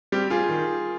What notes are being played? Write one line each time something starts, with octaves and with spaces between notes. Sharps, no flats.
G3 C4 G4
F4 G#4
D#3